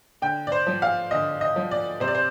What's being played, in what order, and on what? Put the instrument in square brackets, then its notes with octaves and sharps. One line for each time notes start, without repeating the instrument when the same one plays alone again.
[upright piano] D3 G5
D5
C5
F3
F5
D3 D#5
D#5
F3
D5
C3 C5
D5
C5